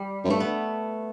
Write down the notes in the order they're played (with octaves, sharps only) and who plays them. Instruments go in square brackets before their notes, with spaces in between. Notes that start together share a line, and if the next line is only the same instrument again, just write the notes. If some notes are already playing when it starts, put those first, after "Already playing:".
Already playing: [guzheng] G3
[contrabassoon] F#2
[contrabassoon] G2 [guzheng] A3
[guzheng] B3